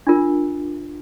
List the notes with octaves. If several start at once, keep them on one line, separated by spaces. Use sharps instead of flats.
D4 F4 A#4